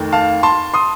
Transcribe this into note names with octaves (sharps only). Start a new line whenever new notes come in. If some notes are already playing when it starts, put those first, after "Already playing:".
Already playing: F2 D#3 A3
F5 A5
A5 C6
C6 D#6